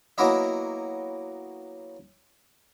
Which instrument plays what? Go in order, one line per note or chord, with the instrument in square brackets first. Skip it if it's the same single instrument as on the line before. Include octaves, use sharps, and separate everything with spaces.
[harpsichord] F#3 A#3 B3 E4 D#5 E5